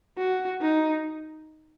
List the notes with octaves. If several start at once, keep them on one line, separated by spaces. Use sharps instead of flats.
F#4
D#4